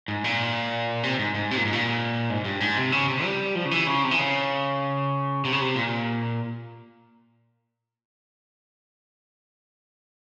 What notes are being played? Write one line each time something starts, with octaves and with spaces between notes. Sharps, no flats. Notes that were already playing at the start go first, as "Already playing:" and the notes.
G#2
A#2
C3
G#2
G#2
C3
A#2
G#2
A#2
G#2
G2
G#2
C3
C#3
C3
G3
F3
C#3
E3
C#3
C3
E3
C#3
C3
C#3
C3
A#2